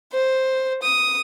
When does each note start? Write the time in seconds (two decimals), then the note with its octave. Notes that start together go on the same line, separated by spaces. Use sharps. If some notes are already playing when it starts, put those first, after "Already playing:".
0.13 C5
0.82 D#6